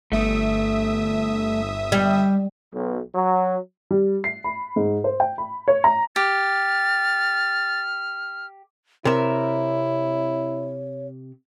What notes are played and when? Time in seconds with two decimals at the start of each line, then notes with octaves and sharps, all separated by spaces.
0.12 G1 A3 E5 D#6
1.92 G3
2.74 B1
3.15 F#3
3.91 G3
4.24 C7
4.44 B5
4.76 G#2
5.04 C5
5.20 G5
5.38 B5
5.68 C#5
5.84 A#5
6.16 G4 F6 A6
9.05 C3 E4 A#4 C#5 E5